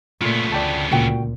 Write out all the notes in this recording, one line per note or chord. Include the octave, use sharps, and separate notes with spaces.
A#2 C#3 A3 B3 F4
D2 D5 G5 A5
C#2 A#2 F#4 G5